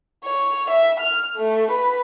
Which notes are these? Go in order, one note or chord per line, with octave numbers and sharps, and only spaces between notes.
C#5
E5
F6
A3
B4